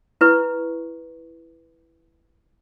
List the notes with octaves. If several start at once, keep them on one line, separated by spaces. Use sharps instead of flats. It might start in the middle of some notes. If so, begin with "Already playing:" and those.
E4 B4 C#6